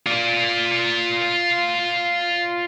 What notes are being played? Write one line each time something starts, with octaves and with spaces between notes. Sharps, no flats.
F4 D5